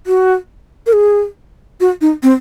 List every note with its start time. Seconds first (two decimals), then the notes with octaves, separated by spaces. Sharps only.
0.07 F#4
0.87 A#4
0.93 G#4
1.81 F#4
2.01 D#4
2.23 C4